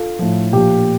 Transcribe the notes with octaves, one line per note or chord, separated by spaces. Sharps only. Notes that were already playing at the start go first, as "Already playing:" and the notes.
Already playing: F4 A4
A2 F3
A#2 F3 G4